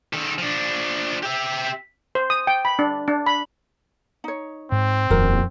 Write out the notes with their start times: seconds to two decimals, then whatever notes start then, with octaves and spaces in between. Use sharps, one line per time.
0.13 D#3 A4
0.38 F3 D4
1.23 G4 E5
2.15 C5
2.30 D#6
2.47 G5
2.65 B5
2.79 D4
3.08 D4
3.26 B5
4.24 D#4 C#5
4.72 G#2 C4
5.10 D#1 F2 F3 F#4 A#4